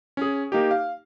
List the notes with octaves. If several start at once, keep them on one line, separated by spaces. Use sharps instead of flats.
C#4 G#4
A#3 D#4 G4
F5